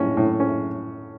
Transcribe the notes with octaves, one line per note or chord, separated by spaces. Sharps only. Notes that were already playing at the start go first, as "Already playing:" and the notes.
Already playing: A2 C#4
A2
C#4